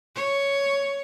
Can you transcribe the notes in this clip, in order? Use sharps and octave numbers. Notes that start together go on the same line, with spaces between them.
C#5